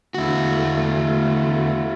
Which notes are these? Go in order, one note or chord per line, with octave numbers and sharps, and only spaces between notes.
E2 D3 A3 E4 F#4